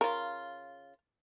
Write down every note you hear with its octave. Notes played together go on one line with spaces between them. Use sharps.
C#3 F4 A#4